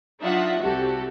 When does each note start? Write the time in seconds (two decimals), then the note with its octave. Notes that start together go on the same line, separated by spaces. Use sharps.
0.20 F#3 D4 D#4 F4 E5 F#5
0.60 C2 C3 F#4 G4 A4